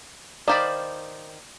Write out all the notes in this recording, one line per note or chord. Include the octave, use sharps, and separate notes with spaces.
D#3 C5 D5 F5 B5